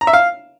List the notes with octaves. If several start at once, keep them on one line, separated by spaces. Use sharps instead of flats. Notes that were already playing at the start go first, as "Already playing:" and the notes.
A#5
E5
F5